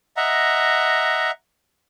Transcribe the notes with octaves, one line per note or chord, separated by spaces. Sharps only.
D#5 E5 F#5 A#5